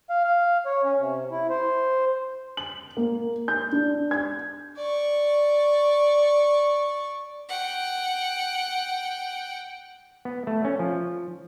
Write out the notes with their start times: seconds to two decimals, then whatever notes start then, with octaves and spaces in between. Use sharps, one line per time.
0.10 F5
0.24 F5
0.66 C#5
0.84 C#4
0.98 C3
1.31 E4
1.50 C5
2.57 F#7
2.97 A#3
3.48 G6
3.72 D4
4.11 G#6
4.77 D5 C#6
7.49 F#5 G5
10.25 B3
10.47 A3
10.65 C#4
10.79 F3